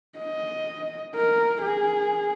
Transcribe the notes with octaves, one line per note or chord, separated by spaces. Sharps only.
D#5
A#4
G#4